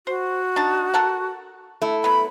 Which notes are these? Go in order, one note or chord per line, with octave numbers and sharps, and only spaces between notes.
F#4 C5
D4 D#4 A5
A4 A#4 F#5
A3 E4
F#3 B3 B5